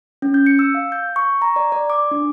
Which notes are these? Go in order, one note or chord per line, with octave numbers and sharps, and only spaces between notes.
C#4
G6
C#7
E6
F5
G6
C#6
A#5
D5
D5
D6
D4